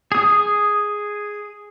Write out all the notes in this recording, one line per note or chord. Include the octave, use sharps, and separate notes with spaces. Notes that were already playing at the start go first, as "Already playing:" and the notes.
G#4 D#6